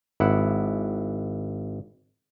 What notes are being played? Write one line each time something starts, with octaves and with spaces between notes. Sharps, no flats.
G#1 E4 F#5